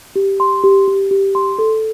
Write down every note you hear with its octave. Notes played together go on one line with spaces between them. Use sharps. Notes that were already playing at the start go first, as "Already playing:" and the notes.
G4
C6
G4
G4
G4
C6
A4